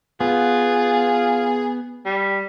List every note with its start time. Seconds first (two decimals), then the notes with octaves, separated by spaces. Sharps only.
0.21 B3 F4 G#4
2.06 G3